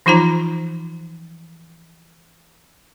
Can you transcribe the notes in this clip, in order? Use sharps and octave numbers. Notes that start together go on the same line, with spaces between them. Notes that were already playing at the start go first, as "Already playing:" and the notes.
E3 F3 D#4 F4 C5 A#5